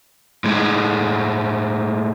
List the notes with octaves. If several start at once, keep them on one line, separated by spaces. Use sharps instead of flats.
A2 G#3